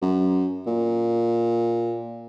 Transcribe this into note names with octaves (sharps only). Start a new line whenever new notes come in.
F#2
A#2